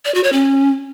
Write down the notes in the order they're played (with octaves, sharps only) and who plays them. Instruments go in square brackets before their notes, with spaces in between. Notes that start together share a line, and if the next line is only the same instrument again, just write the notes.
[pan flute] D5
F#4
C#5
C#4